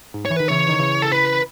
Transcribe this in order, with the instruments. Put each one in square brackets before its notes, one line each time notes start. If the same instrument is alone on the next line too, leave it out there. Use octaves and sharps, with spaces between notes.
[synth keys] G#2
[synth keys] E3 [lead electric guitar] C#5
[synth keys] D#3 [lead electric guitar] B4
[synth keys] C#3 E3 [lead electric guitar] C#5
[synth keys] D#3
C#3 E3
[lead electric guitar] A4
B4